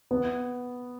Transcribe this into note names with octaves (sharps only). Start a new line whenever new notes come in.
B3